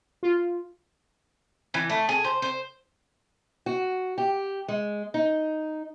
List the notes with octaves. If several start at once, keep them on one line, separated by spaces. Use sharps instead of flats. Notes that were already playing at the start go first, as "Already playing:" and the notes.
F4
E3
A3
G#4
C5
C5
F#4
G4
G#3
D#4